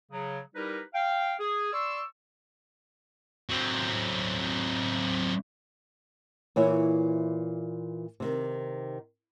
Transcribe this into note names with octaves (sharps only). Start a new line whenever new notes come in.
C#3 F#3
G3 D#4 E4 G4 A#4 B4
F5 G5
G#4
D5 C6 C#6 E6
F#3 C4
A#2 E3 C#5 E5
C3 D#3